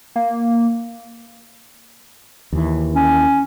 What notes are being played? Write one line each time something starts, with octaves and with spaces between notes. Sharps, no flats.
A#3
D#2 E3
C#4